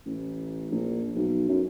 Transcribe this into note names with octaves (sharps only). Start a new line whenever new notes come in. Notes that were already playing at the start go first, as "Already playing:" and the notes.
A1
A#1
B1
F#2